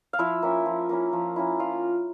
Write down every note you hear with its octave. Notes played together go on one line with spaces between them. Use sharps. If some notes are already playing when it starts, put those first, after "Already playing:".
F5
F3 E4 E5
A#3 C#4 E4
F3
A#3 C#4 E4
F3
A#3 C#4 E4
F3 F4 F5